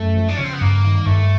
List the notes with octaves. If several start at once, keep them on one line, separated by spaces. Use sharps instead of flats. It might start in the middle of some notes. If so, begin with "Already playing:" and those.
Already playing: F#2 A3
F3
D4
C#3 C#4
C4
B3
G2 A#3
D#3
G2 A3